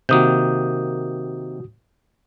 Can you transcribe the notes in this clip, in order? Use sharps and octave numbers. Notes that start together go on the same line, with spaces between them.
C3 D#3 A#3 F#4 D#6 G6